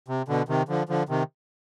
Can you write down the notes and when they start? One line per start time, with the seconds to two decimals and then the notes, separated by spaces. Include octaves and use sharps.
0.08 C3
0.28 B2 D3
0.48 C3 D#3
0.69 D3 F3
0.89 D3 F3
1.09 C3 D#3